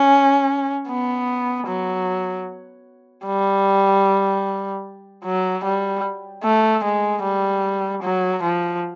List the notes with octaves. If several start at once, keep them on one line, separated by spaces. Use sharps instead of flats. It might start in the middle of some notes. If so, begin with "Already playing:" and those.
Already playing: C#4
B3
F#3
G3
F#3
G3
A3
G#3
G3
F#3
F3